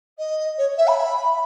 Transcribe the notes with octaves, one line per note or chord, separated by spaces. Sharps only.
D#5
C#5
E5
B5